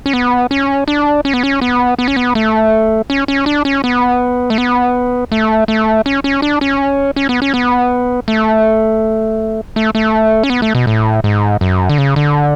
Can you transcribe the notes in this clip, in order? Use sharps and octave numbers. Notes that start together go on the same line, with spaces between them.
C#4
B3
C#4
D4
C#4
B3
C#4
B3
B3
C#4
B3
A3
C#4
C#4
D4
C#4
B3
A3
B3
A3
A3
C#4
C#4
D4
C#4
C#4
B3
C#4
B3
A3
A3
A3
C#4
B3
A3
B2
A2
G#2
F#2
D3
C#3
D3